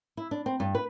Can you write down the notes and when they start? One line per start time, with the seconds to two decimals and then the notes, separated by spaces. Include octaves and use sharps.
0.17 E4
0.31 D4
0.46 C4
0.60 G2
0.75 B4